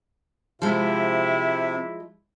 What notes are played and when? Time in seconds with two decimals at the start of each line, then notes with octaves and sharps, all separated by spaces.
0.62 C3 F3 G#3 E4